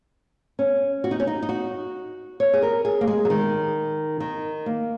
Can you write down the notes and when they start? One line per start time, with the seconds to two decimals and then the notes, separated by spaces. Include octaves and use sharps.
0.59 C#4
1.04 F#4
1.11 D#4
1.20 C#4
1.27 D#4
1.42 D#4
1.49 F#4
2.40 C#5
2.53 G#4
2.62 A#4
2.85 G#4
3.01 A#3
3.07 G#3
3.25 F#3
3.30 D#3
4.20 D#3
4.66 A#3